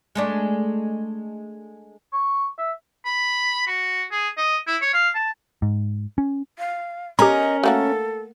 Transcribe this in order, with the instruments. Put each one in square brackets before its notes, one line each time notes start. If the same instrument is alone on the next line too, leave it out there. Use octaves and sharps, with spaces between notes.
[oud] G#3 A3 D4
[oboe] C#6
E5
[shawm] B5
F#4
G#4
D#5
E4
C#5
F5
A5
[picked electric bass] G#2
C#4
[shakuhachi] F5
[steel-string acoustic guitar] C#4 A#4 [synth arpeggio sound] G4 A#5 [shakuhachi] D#5
[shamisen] A3 A#3 F#4 [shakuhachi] A4